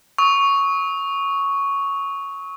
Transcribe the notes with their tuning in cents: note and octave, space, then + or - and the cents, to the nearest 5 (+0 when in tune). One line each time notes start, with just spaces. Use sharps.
C#6 +5 E6 -45